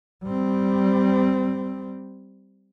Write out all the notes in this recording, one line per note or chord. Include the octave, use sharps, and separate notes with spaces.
G3 C4